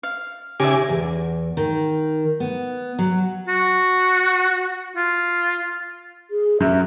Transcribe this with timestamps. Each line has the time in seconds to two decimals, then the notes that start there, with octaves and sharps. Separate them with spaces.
0.03 F5
0.60 C#3 D#4 G4 D5 E5 G#5 D6
0.89 E2
1.57 D#3
2.40 B3
2.99 F#3
3.48 F#4
4.96 F4
6.31 G#4
6.61 F#2 E5